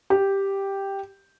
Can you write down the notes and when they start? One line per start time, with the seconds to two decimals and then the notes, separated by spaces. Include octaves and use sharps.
0.10 G4